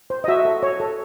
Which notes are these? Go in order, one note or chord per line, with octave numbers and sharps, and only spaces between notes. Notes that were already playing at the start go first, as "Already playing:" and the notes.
C5
D#5
F#4 E5
A4
C#5
A4